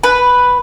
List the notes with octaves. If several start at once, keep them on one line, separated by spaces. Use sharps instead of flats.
B4